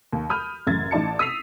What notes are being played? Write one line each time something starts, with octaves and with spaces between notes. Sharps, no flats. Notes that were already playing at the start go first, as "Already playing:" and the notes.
D#2
B5 D#6 F6 G6
A1 F#2 C#3 G#6 A6
A1 D#4 D5 A5 C#7
D#6 E6 B6 C7 F7